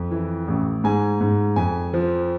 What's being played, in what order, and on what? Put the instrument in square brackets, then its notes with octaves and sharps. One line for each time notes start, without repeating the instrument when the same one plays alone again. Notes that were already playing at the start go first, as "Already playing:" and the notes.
Already playing: [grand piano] F2
E3
A1
G#2 G#5
G#2
F2 G#5
F3